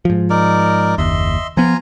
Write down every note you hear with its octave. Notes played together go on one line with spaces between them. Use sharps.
G#2 F3
D#4 A#4 D5
F#1 D#2 D#5 E5 C6
F3 B3 F4 G#5 A#5